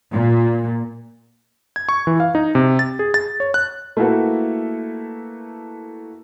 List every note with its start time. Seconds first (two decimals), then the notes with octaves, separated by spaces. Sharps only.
0.12 A#2
1.76 G#6
1.89 C#6
2.07 E3
2.20 F5
2.35 D#4
2.55 C3
2.79 A6
2.99 G#4
3.14 A6
3.40 C#5
3.54 F#6
3.97 A3 A#3 E4 F#4 A4 B4